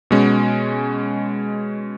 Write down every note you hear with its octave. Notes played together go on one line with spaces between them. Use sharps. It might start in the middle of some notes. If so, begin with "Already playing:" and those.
B2 G#3 C#4